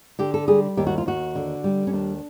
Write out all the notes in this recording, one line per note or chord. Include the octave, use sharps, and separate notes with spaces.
D3 G4
A4
G3 G#4
D#2 G4
F#4
F4
D#2 F#4
D3
G3
C#4
D#2 D4